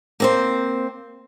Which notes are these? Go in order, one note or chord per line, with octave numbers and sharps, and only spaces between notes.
A#3 C4 C5